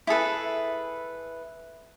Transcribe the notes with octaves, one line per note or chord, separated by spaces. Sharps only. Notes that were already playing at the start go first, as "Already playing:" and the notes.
E4 G#4 A4 B4